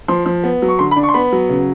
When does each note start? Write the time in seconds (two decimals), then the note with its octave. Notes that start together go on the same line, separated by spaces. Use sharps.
0.08 F3 C6
0.26 F3
0.44 B3
0.62 F#3
0.68 C#6
0.79 D3 C6
0.91 B5
0.96 D4
1.03 C#6
1.09 C6
1.14 B3 B5
1.32 F#3
1.49 C#3